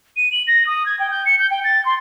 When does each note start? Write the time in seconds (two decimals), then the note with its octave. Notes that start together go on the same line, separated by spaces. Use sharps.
0.16 D#7
0.32 F#7
0.47 A#6
0.66 D#6
0.86 G#6
0.99 G5
1.11 G6
1.26 C#7
1.39 G6
1.50 G5
1.64 A6
1.85 C6